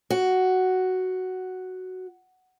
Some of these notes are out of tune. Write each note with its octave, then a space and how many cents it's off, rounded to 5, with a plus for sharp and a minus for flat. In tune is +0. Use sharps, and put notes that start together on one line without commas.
F#4 +5